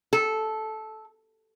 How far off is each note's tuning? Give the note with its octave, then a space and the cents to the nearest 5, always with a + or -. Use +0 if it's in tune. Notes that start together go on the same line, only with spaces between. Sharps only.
A4 -10